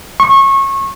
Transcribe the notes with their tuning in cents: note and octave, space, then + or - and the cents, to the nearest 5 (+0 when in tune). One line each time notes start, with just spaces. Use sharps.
C#6 -25